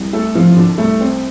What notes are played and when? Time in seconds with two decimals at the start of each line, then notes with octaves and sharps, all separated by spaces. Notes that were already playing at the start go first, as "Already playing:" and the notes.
Already playing: C2
0.13 A3 A4
0.35 C3 F3 F4
0.48 F4
0.56 D3 D4
0.78 C2 A3
1.00 C4